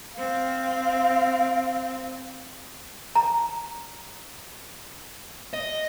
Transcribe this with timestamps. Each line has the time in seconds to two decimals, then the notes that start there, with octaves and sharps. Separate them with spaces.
0.17 C4 F5
3.15 A#5
5.53 D#5